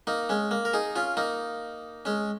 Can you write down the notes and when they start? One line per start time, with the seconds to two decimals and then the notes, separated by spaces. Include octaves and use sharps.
0.07 A#3 D#4
0.29 G#3 C#4
0.51 A#3
0.65 A#4
0.73 D#4 G#4
0.96 C#4 F4
1.17 A#3 D#4
2.05 G#3 C#4